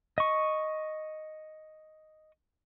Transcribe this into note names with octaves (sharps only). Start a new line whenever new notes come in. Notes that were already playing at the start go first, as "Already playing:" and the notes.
D#5 C#6